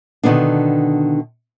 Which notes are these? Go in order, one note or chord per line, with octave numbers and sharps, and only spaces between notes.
B2 D3 D#3 G#3 B3 D4